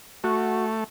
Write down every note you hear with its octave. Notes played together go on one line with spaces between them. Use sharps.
A3 F#4